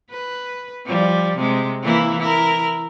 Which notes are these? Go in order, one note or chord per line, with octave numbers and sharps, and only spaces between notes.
B4
F3 G3
C3 G#3
E3 A#3 E4
E4 A#4